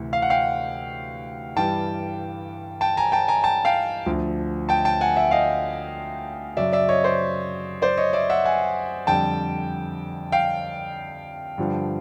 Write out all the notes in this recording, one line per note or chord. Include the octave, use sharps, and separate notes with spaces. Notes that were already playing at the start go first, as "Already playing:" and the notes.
Already playing: D2 C3 E3
F5
F#5
F5 G5
G2 E3 G3 G5 A5
G5 A5
G#5 A#5
G5 A5
G#5 A#5
G5 A5
F5 G5
D2 D3 F3
G5 A5
G5 A5
F#5 G#5
E5 F#5
D#5 F5
F#2 C#3 F#3 D5 E5
D5 E5
C#5 D#5
C5 D5
C5 D5
C#5 D#5
D5 E5
E5 F#5
F#5 G#5
F2 D3 G3 G5 A5
F5 G5
G2 D3 F3